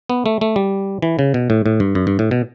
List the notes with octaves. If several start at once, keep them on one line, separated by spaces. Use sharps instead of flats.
B3
A3
A3
G3
E3
C#3
B2
A2
A2
G2
F#2
G2
A2
B2